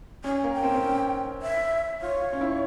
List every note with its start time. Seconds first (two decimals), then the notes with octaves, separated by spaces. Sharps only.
0.24 C#4 G#5
0.44 A#3
0.53 G5
0.63 C4
0.74 C4
0.84 C#4
1.42 E5
2.01 F4 C#5
2.21 F4
2.33 C#4
2.41 E4